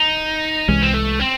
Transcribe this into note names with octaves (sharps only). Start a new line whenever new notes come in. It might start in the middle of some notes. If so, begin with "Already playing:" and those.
Already playing: D#4
C2 C3 E3 G#3 C#4
C4
A3
C4